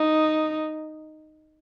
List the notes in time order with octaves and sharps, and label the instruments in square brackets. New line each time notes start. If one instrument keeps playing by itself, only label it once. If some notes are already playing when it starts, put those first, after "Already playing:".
Already playing: [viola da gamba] D#4